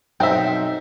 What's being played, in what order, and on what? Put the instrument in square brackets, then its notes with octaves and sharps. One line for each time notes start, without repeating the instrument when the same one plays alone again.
[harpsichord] B1 C4 [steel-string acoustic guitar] D#4 [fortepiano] E5 G5